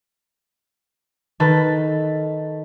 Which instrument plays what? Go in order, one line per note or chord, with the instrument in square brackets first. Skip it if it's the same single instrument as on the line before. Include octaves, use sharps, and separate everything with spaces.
[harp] D#3 A4 B4